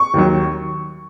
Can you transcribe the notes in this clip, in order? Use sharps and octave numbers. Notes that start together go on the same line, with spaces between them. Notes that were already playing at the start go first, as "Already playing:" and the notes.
Already playing: C#6
D#2 D#3 F#3